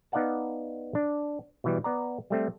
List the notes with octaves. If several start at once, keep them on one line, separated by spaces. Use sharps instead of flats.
B3 D#4 D5 F5 F#5 A5
D4
B2 E3 G3
B3 D5 A#5
G3 A3 C4